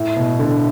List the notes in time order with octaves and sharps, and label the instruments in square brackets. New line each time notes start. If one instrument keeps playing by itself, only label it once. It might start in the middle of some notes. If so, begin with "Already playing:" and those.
Already playing: [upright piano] A2
B2
D3